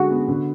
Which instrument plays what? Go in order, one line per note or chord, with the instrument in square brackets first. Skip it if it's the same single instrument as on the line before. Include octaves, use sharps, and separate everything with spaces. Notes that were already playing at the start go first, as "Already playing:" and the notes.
Already playing: [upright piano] D3 G#3 [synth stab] F#4
[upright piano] B3
D3